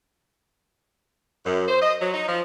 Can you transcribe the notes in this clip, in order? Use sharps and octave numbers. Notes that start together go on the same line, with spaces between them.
F#2
C5
D#5
F#3
D#4
F3